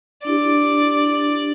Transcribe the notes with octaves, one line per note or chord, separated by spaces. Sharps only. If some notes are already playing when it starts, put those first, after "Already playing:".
D4 E4 G4 D5